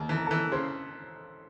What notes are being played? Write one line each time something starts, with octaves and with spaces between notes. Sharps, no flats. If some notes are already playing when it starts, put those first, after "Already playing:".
Already playing: D#2 G#4
E3 A5
A#5
E3 A4 A5
C#3 C5 C6